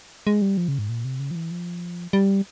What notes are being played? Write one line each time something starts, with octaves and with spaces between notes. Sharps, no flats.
G#3
G3
F3
C#3
G#2
A#2
C3
C#3
F3
E3
F3
G3